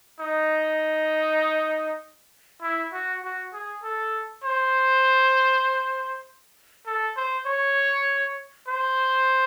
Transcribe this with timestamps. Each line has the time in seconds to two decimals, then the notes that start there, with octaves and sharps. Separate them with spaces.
0.20 D#4
2.62 E4
2.93 F#4
3.24 F#4
3.53 G#4
3.83 A4
4.44 C5
6.86 A4
7.17 C5
7.46 C#5
8.68 C5